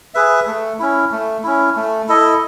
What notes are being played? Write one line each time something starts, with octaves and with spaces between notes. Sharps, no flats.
G#4 B4 E5
A3
C#4 E4
A3
C#4 E4
A3
E4 A4 D#5